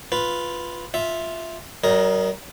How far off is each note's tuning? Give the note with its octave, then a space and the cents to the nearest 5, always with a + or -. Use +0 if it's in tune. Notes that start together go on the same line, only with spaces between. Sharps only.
F4 +0 B4 +0
F4 +0 E5 -5
F#3 +40 A#4 +0 D#5 +0